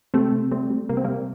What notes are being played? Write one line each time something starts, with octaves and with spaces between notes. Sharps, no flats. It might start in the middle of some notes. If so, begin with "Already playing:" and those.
C3 A3 C4
C3
G3 A3 C4
G3
C3 A#3
C4
C3 G3 A#3